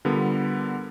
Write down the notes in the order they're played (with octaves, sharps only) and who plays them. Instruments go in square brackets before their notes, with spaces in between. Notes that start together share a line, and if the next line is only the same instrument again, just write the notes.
[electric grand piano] D3 G3 B3 F4 A#4